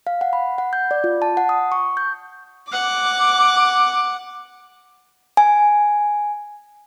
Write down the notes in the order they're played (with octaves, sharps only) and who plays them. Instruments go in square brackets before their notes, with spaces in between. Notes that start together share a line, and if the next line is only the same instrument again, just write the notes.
[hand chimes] F5
F#5
B5
F#5
G6
D5
F4
A5
F#5
D#6
C#6
G6
[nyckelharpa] F#5 [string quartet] D6
[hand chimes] G#5